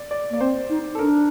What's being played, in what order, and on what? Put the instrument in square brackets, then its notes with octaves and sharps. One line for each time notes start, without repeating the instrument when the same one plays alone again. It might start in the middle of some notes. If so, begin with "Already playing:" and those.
Already playing: [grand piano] D5
D5
[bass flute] A#3 [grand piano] D5
[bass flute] C4 [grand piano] C5
[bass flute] D#4
[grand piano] A4
[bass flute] D4 [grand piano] A#4